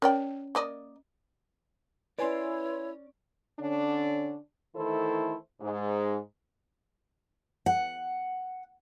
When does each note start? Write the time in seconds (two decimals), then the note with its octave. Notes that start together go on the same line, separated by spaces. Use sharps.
0.02 C#4 A#4 C#5 D5 G5
0.55 A#3 D5 D#5
2.19 C#4 E4 B4 C#5 D5 G#5 C6
3.59 D3 C#4 D4
4.76 D#3 E3 A3 E4 A4 C5
5.61 G#2
7.66 F#5